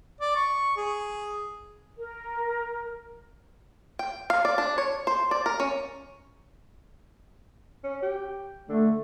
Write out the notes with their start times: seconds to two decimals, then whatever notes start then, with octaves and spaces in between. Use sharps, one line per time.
0.21 D5
0.36 C#6
0.77 G#4
1.98 A#4
3.99 G5
4.30 F5
4.45 D5
4.58 D4
4.78 C#5
5.07 C5
5.31 D5
5.46 A#4
5.60 C#4
7.84 C#4
8.02 G4
8.69 D3 A3